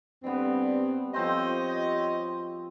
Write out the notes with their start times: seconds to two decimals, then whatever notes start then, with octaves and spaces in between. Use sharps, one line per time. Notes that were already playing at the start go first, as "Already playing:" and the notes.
0.24 G2 G3 B3 C4
1.14 F3 C4 G4 C5 C#5 D#5